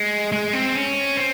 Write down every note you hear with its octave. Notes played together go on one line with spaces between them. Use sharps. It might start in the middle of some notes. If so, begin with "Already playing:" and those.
Already playing: G#3
G#3
C4
C#4
C4